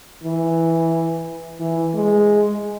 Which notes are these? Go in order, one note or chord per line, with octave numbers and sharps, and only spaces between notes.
E3
E3
G#3